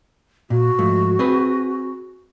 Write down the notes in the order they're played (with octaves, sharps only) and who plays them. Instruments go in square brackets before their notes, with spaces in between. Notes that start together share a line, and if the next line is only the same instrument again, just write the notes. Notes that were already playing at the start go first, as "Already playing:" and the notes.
[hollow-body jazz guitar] A#2 [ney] F#4
[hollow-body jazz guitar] G#2 F3 A3
C4 G#4 B4